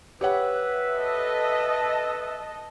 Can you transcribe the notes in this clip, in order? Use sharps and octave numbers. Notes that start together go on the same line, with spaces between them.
G4 B4 C#5 E5 F#5
A4 D#5